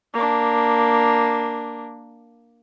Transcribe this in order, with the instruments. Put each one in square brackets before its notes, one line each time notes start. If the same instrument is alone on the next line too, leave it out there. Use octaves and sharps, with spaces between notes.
[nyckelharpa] A#3 D4